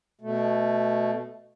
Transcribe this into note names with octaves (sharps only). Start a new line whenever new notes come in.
B2 A3